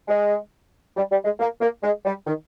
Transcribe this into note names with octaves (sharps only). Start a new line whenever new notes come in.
G#3
G3
G3
G#3
A#3
A#3
G#3
G3
D#3